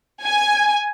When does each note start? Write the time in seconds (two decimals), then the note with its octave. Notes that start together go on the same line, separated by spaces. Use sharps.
0.24 G#5